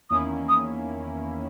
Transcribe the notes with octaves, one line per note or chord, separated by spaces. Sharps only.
E2 D#3 A#3 C#4 E4 D#6
D#6